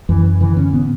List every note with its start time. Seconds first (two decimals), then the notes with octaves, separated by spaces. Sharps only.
0.09 F#2 E3
0.41 D3 E3
0.57 C#4
0.73 A2 B3